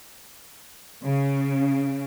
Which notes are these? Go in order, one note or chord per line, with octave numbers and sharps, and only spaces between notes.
C#3